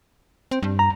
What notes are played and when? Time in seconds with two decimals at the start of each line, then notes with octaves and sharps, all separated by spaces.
0.51 C4
0.63 G2
0.79 A#5